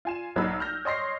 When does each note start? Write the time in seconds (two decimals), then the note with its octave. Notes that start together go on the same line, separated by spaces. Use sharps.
0.05 F4 G#5 E7
0.36 B1 F#3 A#3 D#4 B5 E6
0.59 E6 F6 G6 A#6
0.85 C#5 D#5 C6 A#6 C7